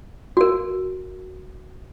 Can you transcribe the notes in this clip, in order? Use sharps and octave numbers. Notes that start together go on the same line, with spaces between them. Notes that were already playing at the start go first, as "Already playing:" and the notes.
F#4 A#4